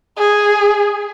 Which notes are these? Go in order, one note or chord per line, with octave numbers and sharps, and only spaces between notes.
G#4